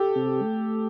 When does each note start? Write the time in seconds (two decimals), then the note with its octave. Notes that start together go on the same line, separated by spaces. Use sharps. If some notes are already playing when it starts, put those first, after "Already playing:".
Already playing: G4 A4
0.16 C3
0.44 A3